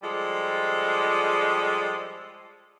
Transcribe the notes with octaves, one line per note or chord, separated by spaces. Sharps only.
F3 G3 G#3 A4